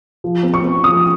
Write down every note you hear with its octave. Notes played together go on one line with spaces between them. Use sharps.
F3
C4
C#6
C4
F3 D#6